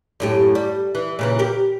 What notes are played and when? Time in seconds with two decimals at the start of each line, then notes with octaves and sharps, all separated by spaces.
0.20 F#2 A2 G4
0.55 G3
0.95 E3
1.19 A#2 C#3 E3
1.39 G4 A#4